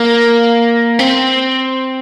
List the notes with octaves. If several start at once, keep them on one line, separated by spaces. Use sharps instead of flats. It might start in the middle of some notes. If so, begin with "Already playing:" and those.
Already playing: A#3
C4